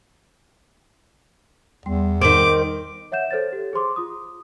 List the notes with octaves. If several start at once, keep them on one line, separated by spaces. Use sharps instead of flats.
E2 G3 C6
D#3 C4 D6
C#5 E5 F#5 G6 E7
A4 C5 C#5 A6
G4
G#4 C5 C6 D6
F4 D#6